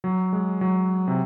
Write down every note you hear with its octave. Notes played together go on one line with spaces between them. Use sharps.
F#3
G#3
F#3
C3